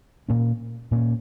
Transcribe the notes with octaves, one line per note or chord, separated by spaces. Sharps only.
A#2 A#3 C#4
A#2 A#3 C#4